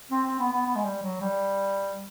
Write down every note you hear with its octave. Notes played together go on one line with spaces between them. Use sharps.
C4
C4
B3
B3
B3
G#3
G3
F#3
G3